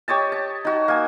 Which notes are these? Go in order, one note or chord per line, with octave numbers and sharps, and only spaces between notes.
G4 C#5 D#5 A5
A5
D#4 F#4
A#3 G#5